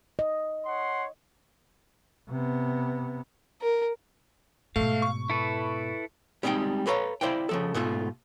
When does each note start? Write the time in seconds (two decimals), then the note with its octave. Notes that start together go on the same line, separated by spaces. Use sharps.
0.19 D#5
0.66 C#5 F#5 C6
2.30 C3 B3
3.61 A#4
4.76 G#2 B2 A3 F5
5.02 C#6
5.30 E4 A4 B4
6.43 G3 G#3 C4 D#4 G5
6.87 A4 B4 C#5 F5 A#5
7.21 E4 C5 D5 F5 G5
7.49 C#3 F3 A4
7.74 G#2 B2 A3 F4